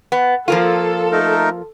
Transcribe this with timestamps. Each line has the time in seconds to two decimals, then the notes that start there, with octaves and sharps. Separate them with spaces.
0.12 B3
0.48 F3 A#3 F4 A4
1.12 A3 D#4 A#4